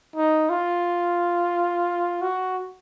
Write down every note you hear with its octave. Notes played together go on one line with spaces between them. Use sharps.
D#4
F4
F#4